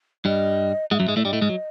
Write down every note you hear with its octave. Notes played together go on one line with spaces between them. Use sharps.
G2 G3 D#5
G#2 G#3 F#5
E5
F#2 F#3
G#2 G#3
A2 A3 D5
G2 G3 D#5
A2 A3
G#2 G#3
F#3